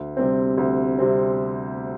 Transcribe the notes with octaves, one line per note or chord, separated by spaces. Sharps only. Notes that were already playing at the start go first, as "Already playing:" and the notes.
Already playing: D2
C3 G3 C4
D2
C3 G3 C4